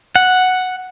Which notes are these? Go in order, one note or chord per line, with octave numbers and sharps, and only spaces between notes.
F#5